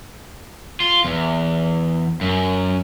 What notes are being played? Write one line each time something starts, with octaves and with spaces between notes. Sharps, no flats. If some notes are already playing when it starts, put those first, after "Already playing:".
F4
E2
F#2